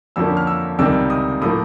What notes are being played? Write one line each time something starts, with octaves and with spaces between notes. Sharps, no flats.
F2 D3 F3 A#3 C#4 E6
F6
E6
C#2 C3 D#3 G3 C4 E6
D#6
A2 F3 A#3 D#6